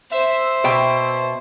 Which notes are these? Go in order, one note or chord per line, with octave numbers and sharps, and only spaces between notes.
C5 E5
B2 G5